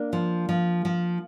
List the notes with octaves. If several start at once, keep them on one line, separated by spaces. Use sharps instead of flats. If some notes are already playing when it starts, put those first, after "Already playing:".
Already playing: A#3 D4
F3
F3
F3